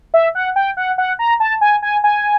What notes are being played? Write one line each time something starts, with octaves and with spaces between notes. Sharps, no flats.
E5
F#5
G5
F#5
F#5
A#5
A5
G#5
G#5
G#5